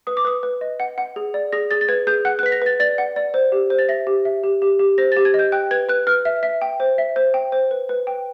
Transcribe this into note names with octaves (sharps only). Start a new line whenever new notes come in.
B4 D#6
D6
B4 D#6
B4
D#5
F#5
F#5
G#4
D5
G#4 A#6
G#4 A6
A6
B4 G#6
G#4 G6
F#5 F#6
F#6
B4 B6
A#6
B4 A6
D5 A6
F#5
D5
C5
G4
C5
A6
E5 A#6
G4
E5
G4
G4
G4
C5 A#6
A6
G4
G#6
D#5
G6
G5 F#6
B4 G#6
B4 F#6
B4 F6
E5
E5
G5
C5
E5
C5
G5
C5
B4
B4
G5